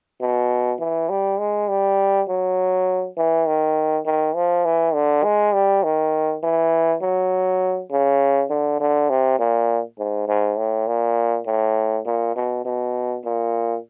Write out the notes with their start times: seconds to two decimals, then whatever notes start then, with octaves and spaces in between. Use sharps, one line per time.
0.21 B2
0.79 E3
1.09 G3
1.39 G#3
1.69 G3
2.28 F#3
3.17 E3
3.46 D#3
4.05 D#3
4.35 F3
4.65 E3
4.94 D3
5.24 G#3
5.54 G3
5.83 D#3
6.43 E3
7.02 F#3
7.91 C#3
8.50 D3
8.80 D3
9.10 C3
9.39 A#2
9.98 G#2
10.28 G#2
10.58 A2
10.87 A#2
11.46 A2
12.06 A#2
12.35 B2
12.65 B2
13.24 A#2